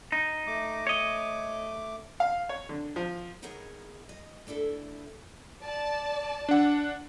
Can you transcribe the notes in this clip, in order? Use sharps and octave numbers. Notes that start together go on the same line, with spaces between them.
D#4
A3 D6
C#5 D#5
F5
C#5
D3
F3
B3 D#4 E4 G#4 A#4 C#5
D#5
A3 D4 E4 A4
D5 A5
D4 F#5